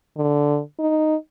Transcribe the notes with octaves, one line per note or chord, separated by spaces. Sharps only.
D3
D#4